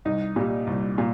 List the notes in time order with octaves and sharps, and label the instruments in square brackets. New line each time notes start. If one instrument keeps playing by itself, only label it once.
[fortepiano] C2 D#4
A#2 G3
C2
A#2